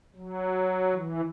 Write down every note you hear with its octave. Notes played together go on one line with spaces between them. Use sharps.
F#3
E3